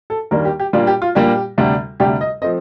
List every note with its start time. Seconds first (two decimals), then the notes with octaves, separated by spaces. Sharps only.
0.10 A4
0.31 D#2 D#3 G3 A#3 D4 A#4
0.45 G4
0.60 G4
0.73 A#2 G3 A#3 D4 F4
0.87 G4
1.02 F4
1.15 A#2 G3 A#3 D4 G4
1.58 D2 C3 G3 D4
2.00 D2 C3 G3 D4 G4
2.21 D#5
2.42 F3 A3 C4 D#5